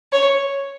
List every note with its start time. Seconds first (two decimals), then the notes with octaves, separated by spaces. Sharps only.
0.12 C#5